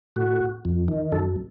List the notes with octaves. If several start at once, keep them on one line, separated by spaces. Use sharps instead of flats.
A2 F#4
F2
D#3
F#2 A4